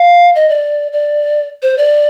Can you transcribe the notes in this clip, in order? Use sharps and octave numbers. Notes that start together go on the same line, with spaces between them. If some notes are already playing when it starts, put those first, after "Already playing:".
Already playing: F5
D#5
D5
D5
C5
D5